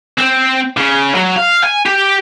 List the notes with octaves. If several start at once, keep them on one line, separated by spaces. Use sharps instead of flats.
C4
C#3
F#3
F5
G#5
G4